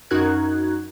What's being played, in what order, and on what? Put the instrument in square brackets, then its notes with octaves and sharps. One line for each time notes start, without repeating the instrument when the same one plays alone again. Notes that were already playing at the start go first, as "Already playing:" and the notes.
[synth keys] F#2 D#4 F#4 A#4 F#6 G#6